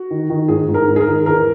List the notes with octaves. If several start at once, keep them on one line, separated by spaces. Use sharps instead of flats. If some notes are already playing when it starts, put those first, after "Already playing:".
Already playing: F#4
D#3
D#3
G#2 G#4
G#2
A#4
G#2
G#4
A#4
D#3
E2 A#4